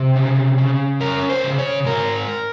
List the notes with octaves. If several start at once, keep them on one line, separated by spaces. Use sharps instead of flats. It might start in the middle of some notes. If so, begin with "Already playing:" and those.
Already playing: C3 G4
C#3
C#3
C#4 A#4
C5
C#3
C#5
G#2 A#4